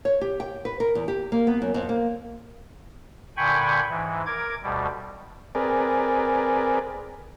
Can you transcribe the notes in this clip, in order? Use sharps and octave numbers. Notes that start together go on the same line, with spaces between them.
C#5
G4
G5
B4
A#4
E2
G4
A#3
B3
F#2
F2
A#3
A#2 D3 G5 G#5 B5 C#6
G#2 E3
A#4 D6 G#6
D2 B2 G3
C4 G#4 A#4 B4 D5